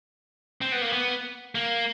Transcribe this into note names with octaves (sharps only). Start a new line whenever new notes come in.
C4
B3
A#3
B3
A#3